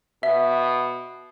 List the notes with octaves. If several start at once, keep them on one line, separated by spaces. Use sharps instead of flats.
B2 E5